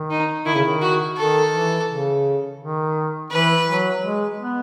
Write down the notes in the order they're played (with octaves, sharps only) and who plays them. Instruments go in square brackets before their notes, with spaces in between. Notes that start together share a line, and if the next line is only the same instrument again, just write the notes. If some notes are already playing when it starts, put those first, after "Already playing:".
Already playing: [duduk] D#3
[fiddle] D#4
[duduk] D#3 [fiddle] E4
[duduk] C#3
D#3
[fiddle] F#4
[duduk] D#3 [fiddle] A4
[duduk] E3
C#3
D#3
[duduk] E3 [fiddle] B4
[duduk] F#3
G#3
B3